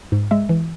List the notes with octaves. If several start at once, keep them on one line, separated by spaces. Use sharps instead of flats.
G#2
G#3 E5
E3